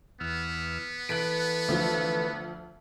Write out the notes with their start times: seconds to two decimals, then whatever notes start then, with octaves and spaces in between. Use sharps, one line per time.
0.20 E2 B3 E6 F6
1.09 E3 A4 B4 F#6 B6 D7
1.68 D2 F3 F4